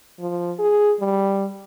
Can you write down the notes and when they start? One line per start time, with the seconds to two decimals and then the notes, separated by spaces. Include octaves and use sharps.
0.19 F3
0.59 G#4
1.00 G3